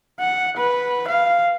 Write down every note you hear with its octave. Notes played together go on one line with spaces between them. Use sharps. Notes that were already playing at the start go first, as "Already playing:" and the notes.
F#5
B4
F5